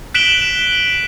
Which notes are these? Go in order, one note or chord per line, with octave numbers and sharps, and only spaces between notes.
F#6 B6 D7 E7 F#7 G7